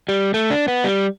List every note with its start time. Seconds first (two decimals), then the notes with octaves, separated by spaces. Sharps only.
0.09 G3
0.34 A3
0.50 D4
0.68 B3
0.84 G3